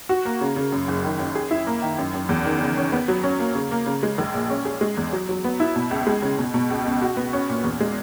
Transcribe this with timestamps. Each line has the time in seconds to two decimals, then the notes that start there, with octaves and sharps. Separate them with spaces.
0.09 F#4
0.25 A#3
0.41 C#3
0.56 C#3
0.72 F#2
0.88 F#1
1.04 D#3
1.19 F#2
1.35 G#4
1.51 E4
1.67 A#3
1.82 D#3
1.98 F#2
2.14 F#2
2.29 E2
2.45 D#3
2.61 C#3
2.77 C#4
2.92 B3
3.08 F#3
3.24 C#4
3.39 A#3
3.55 C#3
3.71 A#3
3.86 C#3
4.03 G#3
4.18 A#1
4.34 A#2
4.50 C#4
4.65 G#4
4.81 G#3
4.97 E2
5.13 F#3
5.29 F#3
5.44 B3
5.60 E4
5.76 B2
5.91 C#2
6.07 G#3
6.22 C#3
6.38 B2
6.54 B2
6.70 C#2
6.86 C#2
7.02 F#4
7.17 B3
7.33 C#4
7.49 A#2
7.64 E2
7.80 G#3